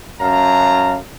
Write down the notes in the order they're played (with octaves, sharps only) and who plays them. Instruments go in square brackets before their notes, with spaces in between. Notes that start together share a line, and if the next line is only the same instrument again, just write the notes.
[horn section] F#2 F5 A5 A#5